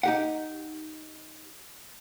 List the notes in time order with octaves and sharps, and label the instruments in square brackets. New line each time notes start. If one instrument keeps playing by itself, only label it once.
[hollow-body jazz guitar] D#4 G4 F#5